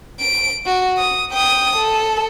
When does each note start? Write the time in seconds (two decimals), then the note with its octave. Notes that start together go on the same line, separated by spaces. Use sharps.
0.20 D7
0.66 F#4
0.98 D#6
1.33 G5 D#6
1.76 A4